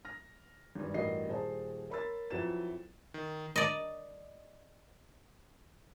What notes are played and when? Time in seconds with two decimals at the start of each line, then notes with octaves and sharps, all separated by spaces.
0.05 F6 A#6
0.75 G#1 G2
0.94 A1 G2 F#4 A#4 D#5 C7
1.29 D#1 G#4 C5 A5
1.90 A#4 C#5 B5 C6 E6 A6
2.30 F2 F#3 E4 B4 A6 E7
3.14 D#3
3.56 D5 D#5